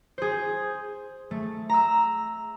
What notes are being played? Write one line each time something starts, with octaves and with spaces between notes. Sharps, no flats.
G#4 C5
A3
A#5 E6